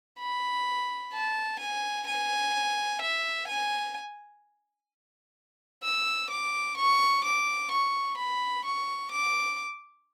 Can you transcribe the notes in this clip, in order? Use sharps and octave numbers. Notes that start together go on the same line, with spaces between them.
B5
A5
G#5
G#5
E5
G#5
E6
D6
C#6
D6
C#6
B5
C#6
D6